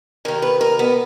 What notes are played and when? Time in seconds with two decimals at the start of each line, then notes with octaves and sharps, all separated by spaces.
0.25 D#2 D#3 A#4
0.42 B4
0.61 A#4
0.79 B3